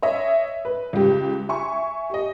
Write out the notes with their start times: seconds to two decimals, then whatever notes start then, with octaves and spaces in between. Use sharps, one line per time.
0.02 C#5 D#5 E5
0.65 B4
0.93 C#2 G4
1.49 E5 G#5 C#6
2.10 G4 D#5